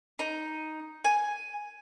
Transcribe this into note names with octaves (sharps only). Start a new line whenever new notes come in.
D#4
G#5